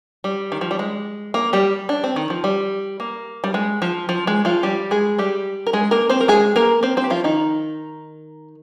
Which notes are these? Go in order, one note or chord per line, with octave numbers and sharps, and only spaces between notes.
G3
D#3
F3
G3
G#3
A#3
G3 G4
D4
C4
D#3
F3
G3
A#3
G3
G#3
F3
F3
G#3
F3 F4
G3 G4
G#3 G#4
G3 G4
A#4
G#3 G#4
A#3 A#4
C4 C5
A#4
G#3 G#4
A#3 A#4
C4 C5
C4 C5
G4
F3 F4
D#3 D#4